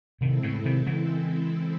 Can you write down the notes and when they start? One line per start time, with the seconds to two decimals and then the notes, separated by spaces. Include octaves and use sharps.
0.21 C3 D#3 G#3 C4 E4 A4
0.43 A2 C#3
0.65 C3 D#3
0.86 C#3 E3